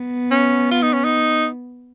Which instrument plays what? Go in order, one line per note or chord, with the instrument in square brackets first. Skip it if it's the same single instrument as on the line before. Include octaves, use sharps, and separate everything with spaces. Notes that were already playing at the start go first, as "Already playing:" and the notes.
Already playing: [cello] B3
[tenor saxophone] C#4
F4
D#4
C#4
D#4